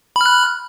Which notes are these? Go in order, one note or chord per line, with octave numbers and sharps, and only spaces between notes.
B5 F6 F#6